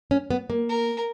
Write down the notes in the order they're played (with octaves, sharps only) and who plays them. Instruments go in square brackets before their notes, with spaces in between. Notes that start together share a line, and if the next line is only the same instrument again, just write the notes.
[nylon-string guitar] C#4
B3
A#3
[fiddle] A#4